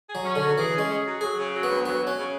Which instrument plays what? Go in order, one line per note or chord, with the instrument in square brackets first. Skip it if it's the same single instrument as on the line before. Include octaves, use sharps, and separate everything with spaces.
[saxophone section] G#4
[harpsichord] F#3
[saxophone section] C#4
[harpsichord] D3
[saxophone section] F#3
[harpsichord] E3 [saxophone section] G#4
[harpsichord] G#3 [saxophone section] C#4
[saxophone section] G#4
F#3
[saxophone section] F#3 [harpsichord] G#4
[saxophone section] C#3
F#3
[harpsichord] B3
[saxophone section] D2
[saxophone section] F#3 [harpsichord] B3
[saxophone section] F#3
[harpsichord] C#4
[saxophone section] C#3